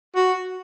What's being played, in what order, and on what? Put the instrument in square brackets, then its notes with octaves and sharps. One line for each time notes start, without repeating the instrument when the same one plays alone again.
[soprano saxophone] F#4